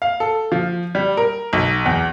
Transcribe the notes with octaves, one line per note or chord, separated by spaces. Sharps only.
F5
A4
F3
G3
A#4
B1
E2